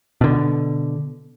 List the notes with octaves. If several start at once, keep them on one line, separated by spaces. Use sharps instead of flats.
B2 D3